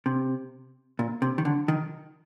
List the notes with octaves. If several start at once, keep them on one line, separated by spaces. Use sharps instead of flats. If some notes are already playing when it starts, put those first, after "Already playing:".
C3
A#2
C3
D#3
D3
D#3